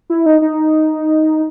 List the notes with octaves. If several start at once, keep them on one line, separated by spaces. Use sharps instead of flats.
E4
D#4
D#4